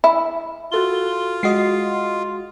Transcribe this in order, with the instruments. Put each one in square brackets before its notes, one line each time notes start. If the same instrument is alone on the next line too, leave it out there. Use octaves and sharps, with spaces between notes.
[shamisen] E4
[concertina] F4 [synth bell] F#4 A4 G7
[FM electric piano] G#3 F#4 D#5 [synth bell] C7